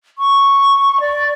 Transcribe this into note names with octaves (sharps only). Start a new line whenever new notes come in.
C#6
D5